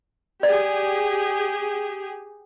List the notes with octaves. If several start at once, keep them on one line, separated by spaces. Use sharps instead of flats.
G4 G#4 D5